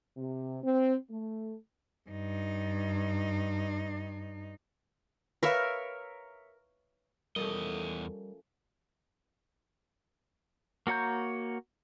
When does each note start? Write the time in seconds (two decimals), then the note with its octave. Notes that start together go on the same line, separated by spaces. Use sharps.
0.17 C3
0.63 C4
1.10 A3
2.10 G2 D#4
5.43 A#4 B4 C#5 E5 F5
7.36 E2 F3 G3 A3 C#4 A#4 D#5
10.87 A#3 F#4 C#5 A#5 G6